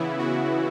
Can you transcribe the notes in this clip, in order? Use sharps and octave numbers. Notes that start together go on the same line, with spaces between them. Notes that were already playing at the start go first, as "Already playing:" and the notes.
Already playing: C#3 E3 B3 E4
F#4